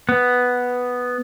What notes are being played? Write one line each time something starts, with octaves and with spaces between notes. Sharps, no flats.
B3